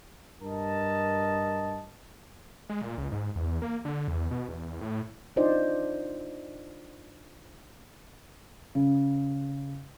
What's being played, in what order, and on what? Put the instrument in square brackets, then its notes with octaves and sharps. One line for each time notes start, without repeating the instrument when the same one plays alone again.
[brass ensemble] G2 A#4 D#5 A5
[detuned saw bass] G#3
A#2
C#2
G#2
E2
A#3
D3
E2
B2
E2
A2
[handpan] D4 D#4 F4 C5 D5 D#5
[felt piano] C#3